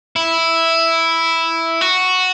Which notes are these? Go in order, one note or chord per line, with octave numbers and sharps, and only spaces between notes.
E4
F#4